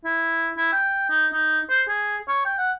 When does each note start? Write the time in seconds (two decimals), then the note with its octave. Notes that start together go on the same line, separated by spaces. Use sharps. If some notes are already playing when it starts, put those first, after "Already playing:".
0.05 E4
0.57 E4
0.73 G5
1.10 D#4
1.33 D#4
1.70 C5
1.89 G#4
2.29 C#5
2.46 G5
2.58 F#5